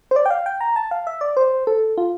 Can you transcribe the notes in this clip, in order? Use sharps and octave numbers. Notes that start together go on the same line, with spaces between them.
C5
D5
G5
F5
G5
A#5
A5
F5
E5
D5
C5
A4
F4